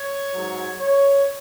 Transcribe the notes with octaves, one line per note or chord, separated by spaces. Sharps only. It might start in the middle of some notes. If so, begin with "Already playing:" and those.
Already playing: C#5
G#2 F#3
C#5